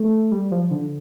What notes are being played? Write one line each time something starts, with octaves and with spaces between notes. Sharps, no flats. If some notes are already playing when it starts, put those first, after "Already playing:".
Already playing: A3
G3
F3
D3